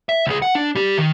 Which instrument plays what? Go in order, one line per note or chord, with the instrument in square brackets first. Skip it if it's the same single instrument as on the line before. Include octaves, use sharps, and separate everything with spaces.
[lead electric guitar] E5
C#2 G#4
F#5
D4
G3 G4
D#3